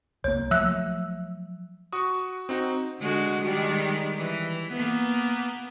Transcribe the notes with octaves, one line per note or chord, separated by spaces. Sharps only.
C2 A#3 C#5
F3 F#3 A3 E5 E6 F#6
F#4 C#6 D#6
C4 D#4 F#4
D3 G#3 F#4
D#3 G3 G#3
E3
A#3 B3